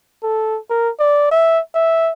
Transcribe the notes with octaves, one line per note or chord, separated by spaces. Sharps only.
A4
A#4
D5
E5
E5